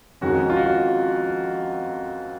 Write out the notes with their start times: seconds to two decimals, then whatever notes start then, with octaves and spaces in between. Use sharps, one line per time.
0.21 F2 D#3 G#3 C#4 F#4
0.50 F4
0.57 F#4